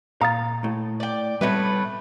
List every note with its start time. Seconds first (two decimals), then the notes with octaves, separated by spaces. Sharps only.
0.21 A#2 F5 A#5 D#6 A6
0.64 A2
1.00 D5 G5
1.41 A2 C3 G3 A3 B3 B4